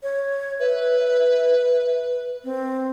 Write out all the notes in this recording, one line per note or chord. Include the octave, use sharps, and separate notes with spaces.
C#5
B4 E5
C4